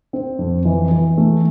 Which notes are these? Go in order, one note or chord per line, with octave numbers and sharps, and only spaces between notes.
C4
F2
E3
E3
A3